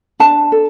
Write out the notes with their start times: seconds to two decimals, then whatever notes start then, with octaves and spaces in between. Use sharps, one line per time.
0.20 D4 A5
0.52 A4